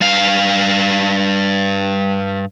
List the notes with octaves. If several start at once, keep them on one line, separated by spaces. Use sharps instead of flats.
G2 F5